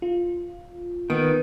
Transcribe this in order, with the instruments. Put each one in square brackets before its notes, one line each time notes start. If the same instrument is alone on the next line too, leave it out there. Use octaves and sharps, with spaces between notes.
[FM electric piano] F4
[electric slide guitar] D#3 [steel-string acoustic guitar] B3